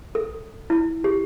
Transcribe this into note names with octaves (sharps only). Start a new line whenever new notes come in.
A4
E4
G4